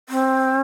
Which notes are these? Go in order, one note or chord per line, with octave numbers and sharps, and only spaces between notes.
C4